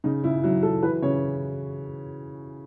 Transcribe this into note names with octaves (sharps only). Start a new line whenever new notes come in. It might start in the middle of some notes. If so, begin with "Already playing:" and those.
C#3 D#4
C#3 E4
F#3 E4
F#3 A4
E3 B4
C#3 C#5